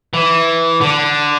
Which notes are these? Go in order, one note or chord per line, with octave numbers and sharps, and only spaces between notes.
E3
D3